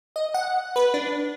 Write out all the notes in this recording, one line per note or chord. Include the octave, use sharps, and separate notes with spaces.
D#5
F#5
B4
D4